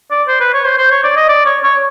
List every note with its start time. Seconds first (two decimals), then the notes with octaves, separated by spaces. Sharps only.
0.11 D5
0.28 C5
0.40 B4
0.54 C#5
0.66 C5
0.78 C5
0.91 C#5
1.03 D5
1.16 D#5
1.29 D5
1.46 C#5
1.63 C#5